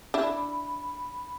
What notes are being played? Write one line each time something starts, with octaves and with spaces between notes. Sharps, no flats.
D4 E4 B5